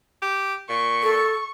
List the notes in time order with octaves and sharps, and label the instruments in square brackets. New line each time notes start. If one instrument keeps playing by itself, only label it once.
[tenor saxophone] G4
[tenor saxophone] A#2 [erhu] C#6
[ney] A4